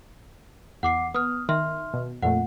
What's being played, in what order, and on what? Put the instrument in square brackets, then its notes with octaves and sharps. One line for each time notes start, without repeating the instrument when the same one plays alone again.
[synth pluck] E2 [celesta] F#5 D6 C7
[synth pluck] B3 [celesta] D#6 F6
[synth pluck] D#3 [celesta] E5 C6 F6
[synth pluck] B2
[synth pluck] F2 A#2 A3 [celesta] F#5